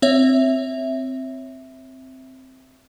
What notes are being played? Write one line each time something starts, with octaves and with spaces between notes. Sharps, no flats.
C4 C#5 E5